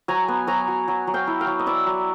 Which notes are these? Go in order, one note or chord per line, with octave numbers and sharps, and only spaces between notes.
F#3 G#5 A#5
B3
F#3 G#5 A#5
F#3
F#3
F#3
F5 G5
E4
F5 G5
F#3
D#5
E4 D5 E5
F#3